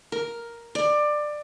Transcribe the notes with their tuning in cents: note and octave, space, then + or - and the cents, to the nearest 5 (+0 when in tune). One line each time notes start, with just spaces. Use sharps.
A#4 +5
D5 +20